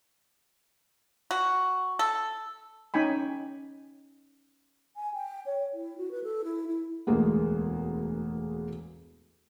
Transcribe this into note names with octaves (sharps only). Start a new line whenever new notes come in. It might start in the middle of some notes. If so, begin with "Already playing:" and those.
F#4
A4
C#4 D#4 G5 G#5 B5
G#5
G5
C#5
E4
F#4
B4
A4
E4
E4
E1 D2 G#3 A#3 B3